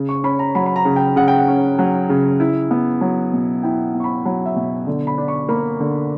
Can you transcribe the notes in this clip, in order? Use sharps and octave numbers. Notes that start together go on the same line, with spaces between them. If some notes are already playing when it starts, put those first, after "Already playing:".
Already playing: C#3
C#6
C#4 B5
A#5
F#3 B5
B5
A#5
C#3
G5
C#3 F#5
G5
F#5
C#4
F#3
C#3
E4
B3
F#3
B2
E4 G5
B3
C#6
B5
F#3 B5
E5
B2
D3
B5
D4
C#6
A#3 B5
D3